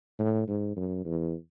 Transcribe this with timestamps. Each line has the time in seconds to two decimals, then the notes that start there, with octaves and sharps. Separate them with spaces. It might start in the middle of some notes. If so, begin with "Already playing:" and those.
0.19 A2
0.48 G#2
0.76 F#2
1.05 E2